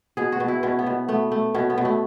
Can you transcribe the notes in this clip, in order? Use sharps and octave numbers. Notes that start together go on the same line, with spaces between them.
B2 G#4
F#4
B2
E4
B2 C#4
B3
B2
A3 B3
A3
B2 C#4
B3
B2
A3